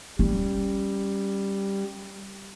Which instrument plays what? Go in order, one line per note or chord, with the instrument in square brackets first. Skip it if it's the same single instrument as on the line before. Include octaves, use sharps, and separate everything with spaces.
[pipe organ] G3 [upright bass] C#4